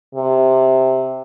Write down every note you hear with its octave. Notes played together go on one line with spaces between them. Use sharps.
C3